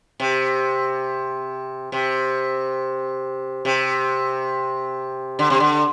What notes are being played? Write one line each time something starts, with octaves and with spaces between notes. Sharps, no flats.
C3
C3
C3
D3
C3
D3